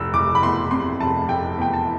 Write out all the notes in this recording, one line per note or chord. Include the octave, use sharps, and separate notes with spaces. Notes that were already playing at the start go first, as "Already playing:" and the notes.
Already playing: F1 E6
F1 D6
B5
E2 C6
C3 C6
F1 A5
F1 G5
E2 G5
A5